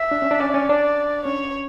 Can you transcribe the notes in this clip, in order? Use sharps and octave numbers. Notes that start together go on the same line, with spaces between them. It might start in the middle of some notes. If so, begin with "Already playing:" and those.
Already playing: E5
D4
C#4
D4
C#4 D5
C#4
D4
C#4 C#5